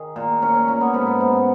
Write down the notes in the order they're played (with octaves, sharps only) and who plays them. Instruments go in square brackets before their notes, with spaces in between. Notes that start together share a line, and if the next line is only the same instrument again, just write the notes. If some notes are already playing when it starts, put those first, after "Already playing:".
Already playing: [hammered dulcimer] D#3 G#4
A#2
A#2 C#4
C#4
A#2 A#3
B3
G#2 B3
B3
G#2 B3
B3